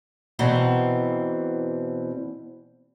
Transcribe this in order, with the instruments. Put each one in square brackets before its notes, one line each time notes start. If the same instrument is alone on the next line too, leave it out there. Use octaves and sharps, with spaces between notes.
[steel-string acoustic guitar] E2 B2 E3 C4 A#5